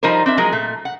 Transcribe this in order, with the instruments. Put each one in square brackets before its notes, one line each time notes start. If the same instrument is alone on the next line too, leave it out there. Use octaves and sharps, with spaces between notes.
[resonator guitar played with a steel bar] F3 G3 D#4 A#4 C5
C4 D4 E5
F3 F#3 G#3 G#4 A#4
A#2 A3
F#5